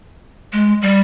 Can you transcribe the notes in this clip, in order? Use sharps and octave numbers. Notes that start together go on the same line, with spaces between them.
G#3
G3